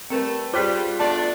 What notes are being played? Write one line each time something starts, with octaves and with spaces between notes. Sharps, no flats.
G3 A3 C4 A#4 B4
G3 F4 G#4 C5 G5 D6 F#6 B6
A3 B3 D4 A5